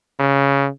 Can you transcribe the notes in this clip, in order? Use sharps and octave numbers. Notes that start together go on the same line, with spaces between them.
C#3